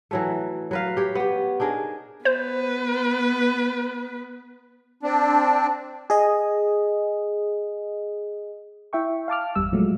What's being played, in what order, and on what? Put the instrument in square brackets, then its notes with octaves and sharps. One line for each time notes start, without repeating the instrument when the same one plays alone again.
[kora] E3 F#3 A3
F#3 B4 F5
G4 C#5
B3 G4
D4 D#4 G#4 A#4
[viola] B3 B4 [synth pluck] C5
[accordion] C4 D4
[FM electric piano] G#4 D#5
E4 E5 G5 C#6
F5 A5 D6 F6
G1 E2 G3 E6
A#2 F3 F#3 G#3 A3